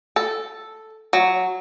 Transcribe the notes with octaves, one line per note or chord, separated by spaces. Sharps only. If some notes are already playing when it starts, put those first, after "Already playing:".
A4
F#3